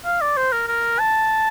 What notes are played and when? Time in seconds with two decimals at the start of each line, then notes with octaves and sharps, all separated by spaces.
0.05 F5
0.21 D5
0.37 C5
0.52 A#4
0.68 A#4
0.99 A5